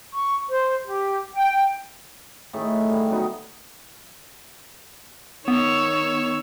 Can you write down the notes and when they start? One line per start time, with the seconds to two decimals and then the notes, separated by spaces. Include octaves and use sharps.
0.13 C#6
0.49 C5
0.86 G4
1.35 G5
2.53 A2 D#3 A3 G#4
2.89 D3 G3
3.10 D#3 F#3 B3 D#4
5.48 D#3 B3 C#5 E6